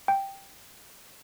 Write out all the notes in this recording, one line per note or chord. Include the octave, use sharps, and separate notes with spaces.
G5